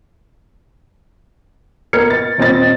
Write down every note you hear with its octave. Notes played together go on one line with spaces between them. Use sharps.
B3 A#4 D#5 F6 G#6 C#7
A6
D#1 C4 D#5 A6